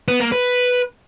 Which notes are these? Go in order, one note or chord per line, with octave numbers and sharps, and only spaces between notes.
B3
A#3
B4